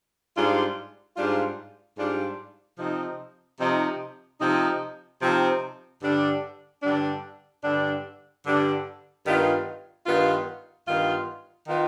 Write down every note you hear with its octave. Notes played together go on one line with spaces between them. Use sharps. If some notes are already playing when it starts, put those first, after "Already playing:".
G#2 G3 D4 F4
G#2 G3 D4 F4
G#2 G3 D4 F4
C3 F3 C4 D#4
C3 F3 C4 D#4
C3 F3 C4 D#4
C3 F3 C4 D#4
G2 D3 G3 D4
G2 D3 G3 D4
G2 D3 G3 D4
G2 D3 G3 D4
G2 D#3 B3 F4
G2 D#3 B3 F4
G2 D#3 B3 F4
D#3 B3 F4